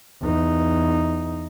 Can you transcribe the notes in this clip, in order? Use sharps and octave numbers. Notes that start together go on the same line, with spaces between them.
E2 D#4